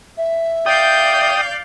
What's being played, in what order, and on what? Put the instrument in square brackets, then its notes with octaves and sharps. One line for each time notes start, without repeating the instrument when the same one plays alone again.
[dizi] E5
[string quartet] D5 F5 G6 [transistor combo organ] G5 D#6